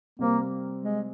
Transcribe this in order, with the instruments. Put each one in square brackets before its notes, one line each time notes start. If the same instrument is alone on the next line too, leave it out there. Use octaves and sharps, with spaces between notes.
[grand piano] C3 G3 C4 [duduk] A#3
[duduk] G#3